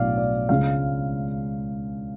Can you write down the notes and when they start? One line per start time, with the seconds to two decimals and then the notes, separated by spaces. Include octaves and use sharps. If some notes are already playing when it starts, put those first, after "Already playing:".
Already playing: B1 A2 F#3 B3 D5 F5
0.17 D5
0.49 C#2 C#3 G#3 F5